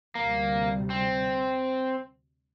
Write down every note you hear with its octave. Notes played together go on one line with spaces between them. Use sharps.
D2 C3 G3 A#3
C4